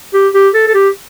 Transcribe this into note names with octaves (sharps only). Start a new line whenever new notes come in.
G4
G4
A4
A4
G4